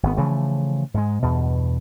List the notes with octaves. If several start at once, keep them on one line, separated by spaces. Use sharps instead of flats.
G#1 B3
C#3 E3 F3 A3
G#2 G#3
E2 G2 B2